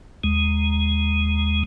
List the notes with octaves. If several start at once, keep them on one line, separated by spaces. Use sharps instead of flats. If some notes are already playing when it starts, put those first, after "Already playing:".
D#2 G#3